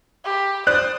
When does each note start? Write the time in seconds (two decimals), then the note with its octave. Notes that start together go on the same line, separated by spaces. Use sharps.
0.25 G4
0.67 C5 D5 D#6 F#6